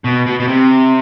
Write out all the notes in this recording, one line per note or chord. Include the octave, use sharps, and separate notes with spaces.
B2
B2
B2
C3